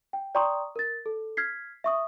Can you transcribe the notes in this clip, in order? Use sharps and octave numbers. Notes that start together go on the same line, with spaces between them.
G5
D5 G5 A#5 C6 C#6 D#6
A#4 A6
A4
F6 G#6 B6 C7
E5 C#6 D#6